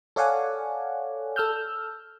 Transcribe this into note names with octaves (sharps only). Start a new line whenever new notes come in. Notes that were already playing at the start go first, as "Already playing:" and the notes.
A4 C#5 D5 F5 F#5 G#5
A4 E6 F6 G6